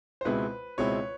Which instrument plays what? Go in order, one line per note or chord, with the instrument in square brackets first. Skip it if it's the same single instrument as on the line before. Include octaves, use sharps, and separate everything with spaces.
[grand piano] C5
[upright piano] C#2 B2 G#3 C4 E4 [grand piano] B4
[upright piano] C#2 B2 G#3 C4 E4 [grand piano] C#5